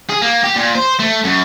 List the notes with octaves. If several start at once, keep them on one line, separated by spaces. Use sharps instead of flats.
G#4
A#3
G4
A#2
C5
A3
F#2